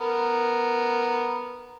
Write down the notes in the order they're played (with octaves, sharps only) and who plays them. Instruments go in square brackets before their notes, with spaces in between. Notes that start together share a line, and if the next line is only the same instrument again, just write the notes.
[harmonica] B3 A#4